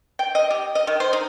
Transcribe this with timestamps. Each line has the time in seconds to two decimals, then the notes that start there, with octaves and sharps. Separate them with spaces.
0.19 G5
0.35 D#5
0.50 G4
0.75 D#5
0.87 D#3
1.00 C5
1.13 D#4